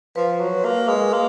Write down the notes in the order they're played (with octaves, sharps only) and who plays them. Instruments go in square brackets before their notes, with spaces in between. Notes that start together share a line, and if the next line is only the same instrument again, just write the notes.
[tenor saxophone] F3 [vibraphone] B4
[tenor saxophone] F#3
A#3
G#3
A#3